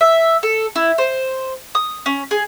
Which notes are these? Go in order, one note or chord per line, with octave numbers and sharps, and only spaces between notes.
E5
A4
E4
C5
D#6
C#4
G#4